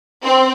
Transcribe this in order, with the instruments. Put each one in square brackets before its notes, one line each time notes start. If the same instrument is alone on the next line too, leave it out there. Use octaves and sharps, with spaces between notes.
[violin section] C4